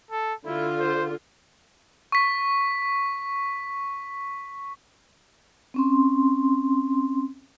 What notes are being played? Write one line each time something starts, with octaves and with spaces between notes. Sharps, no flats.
A4
D3 E4 F4
C5
C#6 B6
C4 C#4 C6